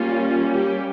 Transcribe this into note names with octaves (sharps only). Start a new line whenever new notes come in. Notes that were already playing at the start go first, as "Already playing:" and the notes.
Already playing: G3 A#3 C#4 F4
G4